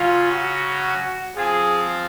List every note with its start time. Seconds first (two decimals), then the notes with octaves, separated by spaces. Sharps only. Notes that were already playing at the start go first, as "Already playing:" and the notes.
Already playing: C#3 F#3 C#4 F4
0.31 F#4
1.36 F3 C4 F4 G#4